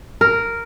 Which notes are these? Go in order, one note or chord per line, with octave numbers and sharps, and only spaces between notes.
A#4